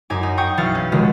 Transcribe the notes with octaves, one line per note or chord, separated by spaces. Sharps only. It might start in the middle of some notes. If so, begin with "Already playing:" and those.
F#2 D#4 G#5 D6
D#4
G5 C#6 D#6 G6 C#7
B1 E3 F5 F6 A6 C#7
C#4
F1 D#3 G#3 F#4